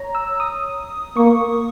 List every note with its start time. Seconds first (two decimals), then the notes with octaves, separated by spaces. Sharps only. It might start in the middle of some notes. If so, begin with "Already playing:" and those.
Already playing: C#5 A#5
0.15 E6
0.40 D#6
1.17 A#3 C#6